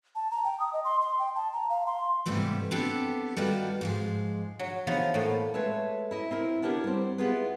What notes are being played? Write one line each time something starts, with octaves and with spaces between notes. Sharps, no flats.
A5
A#5
G5
D#6
D#5
C6
C6
G5
A5
A#5
F5
C6
G#2 C3 E3 G3 A3 B3
B3 C4 D4 G4 A4
D#3 G3 B3 F4 F#4
G#2 F3 G#3
F#3
E3 F3 B3 D#4 G#4
A2 A#3 B3
G#3 A3 A4 B4 C#5
E4 D#5 E5
C4 E4 A#4
B3 D4 G4 A#4 C#5
G3 C4
B3 E4 F4 G#4 B4